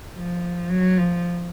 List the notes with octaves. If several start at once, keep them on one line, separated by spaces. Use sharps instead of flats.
F3
F#3
F3